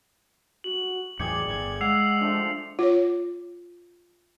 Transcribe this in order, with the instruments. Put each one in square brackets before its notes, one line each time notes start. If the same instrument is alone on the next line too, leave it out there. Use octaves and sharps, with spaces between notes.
[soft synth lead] F#4 [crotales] F#7
[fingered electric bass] E2 A2 E3 [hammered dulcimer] G4 G#4 D5 [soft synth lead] G#6 [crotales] C#7
[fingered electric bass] G1 [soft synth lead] G#6
[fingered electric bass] G#3 [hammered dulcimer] F5 [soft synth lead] F#5 [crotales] E6 C7 F7
[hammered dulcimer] F3 A3 [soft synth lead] D4
[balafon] F4 C#5